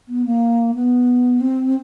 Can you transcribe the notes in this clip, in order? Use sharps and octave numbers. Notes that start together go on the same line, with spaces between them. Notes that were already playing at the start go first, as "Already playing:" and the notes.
B3
A#3
B3
C4